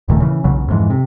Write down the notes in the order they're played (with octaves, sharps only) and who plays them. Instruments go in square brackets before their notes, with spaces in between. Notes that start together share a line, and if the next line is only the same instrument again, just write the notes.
[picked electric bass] D#1 A#2 D#3 A3
C#3 E3
B1 E2 C#3 F#3
F2 G#2 E3
C3